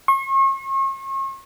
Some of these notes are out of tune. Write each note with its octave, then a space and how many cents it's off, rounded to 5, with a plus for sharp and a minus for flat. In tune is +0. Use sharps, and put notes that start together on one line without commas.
C#6 -40